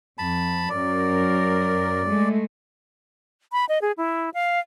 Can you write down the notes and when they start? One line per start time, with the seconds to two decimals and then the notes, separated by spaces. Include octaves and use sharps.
0.18 F2 A5 B5
0.70 F#2 A#4 D5
2.07 G#3 A3
3.52 B5
3.69 D#5
3.82 G#4
3.98 E4
4.34 F5